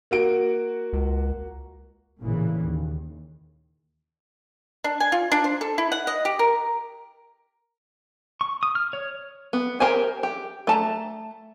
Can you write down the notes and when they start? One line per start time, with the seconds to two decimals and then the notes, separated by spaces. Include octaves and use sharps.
0.11 A#3 F#4 D7
0.93 C#2
2.21 A1 A#2 C#3 E3
2.63 D#2
4.84 D4
5.00 G#5
5.12 F4
5.32 D4
5.44 C5
5.61 A4
5.78 E4
5.92 F#5
6.07 D#5
6.25 G4
6.39 A#4
8.41 C#6
8.63 D#6
8.75 F6
8.93 C#5
9.53 B3
9.80 G4 A#4 C5 G#5
10.23 G4
10.67 A3 A5 A#5